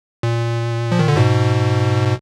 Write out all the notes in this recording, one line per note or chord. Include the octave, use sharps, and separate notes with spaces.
A#2
F3
D#3
D3
G#2 B2